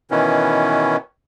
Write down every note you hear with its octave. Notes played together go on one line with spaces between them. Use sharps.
B2 D#3 E3 C#4